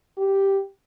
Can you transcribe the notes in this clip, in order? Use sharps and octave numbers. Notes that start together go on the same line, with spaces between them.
G4